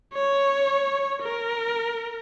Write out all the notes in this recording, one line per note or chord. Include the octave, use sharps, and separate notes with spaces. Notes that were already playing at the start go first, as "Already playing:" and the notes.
C#5
A#4